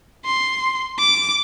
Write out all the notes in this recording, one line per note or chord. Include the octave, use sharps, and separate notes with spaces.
C6
D6